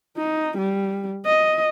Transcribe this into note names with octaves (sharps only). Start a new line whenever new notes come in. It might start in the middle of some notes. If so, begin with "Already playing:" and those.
D#4
G3
D#5